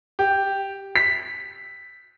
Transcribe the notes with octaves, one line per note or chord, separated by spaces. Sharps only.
G4
B6